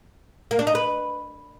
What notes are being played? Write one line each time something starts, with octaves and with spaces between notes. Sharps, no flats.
A#3
D4
D#4
B4